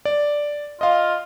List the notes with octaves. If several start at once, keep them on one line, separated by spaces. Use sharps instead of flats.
D5
F4 D#5 F5